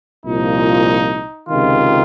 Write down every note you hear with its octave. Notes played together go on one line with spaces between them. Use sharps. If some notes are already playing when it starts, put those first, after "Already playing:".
C2 A#2 F3 D#4
C#2 C3 D#3 F4